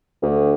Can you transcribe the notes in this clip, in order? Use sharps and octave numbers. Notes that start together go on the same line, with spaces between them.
D2